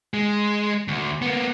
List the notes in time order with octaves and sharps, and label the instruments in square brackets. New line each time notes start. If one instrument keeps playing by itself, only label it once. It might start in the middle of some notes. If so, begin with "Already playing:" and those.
[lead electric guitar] G#3
D2
A#3 B3